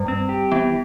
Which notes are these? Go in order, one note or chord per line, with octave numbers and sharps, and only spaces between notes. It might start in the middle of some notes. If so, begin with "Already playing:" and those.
Already playing: G2 G3
C4
G4
E3 B3